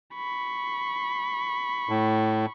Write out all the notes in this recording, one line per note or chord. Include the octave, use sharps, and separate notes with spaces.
B5 C#6
A2